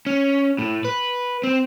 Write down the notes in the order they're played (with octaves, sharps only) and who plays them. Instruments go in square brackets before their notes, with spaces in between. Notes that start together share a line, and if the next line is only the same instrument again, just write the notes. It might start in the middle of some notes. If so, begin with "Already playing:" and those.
[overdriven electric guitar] C#4
A2
B4
C4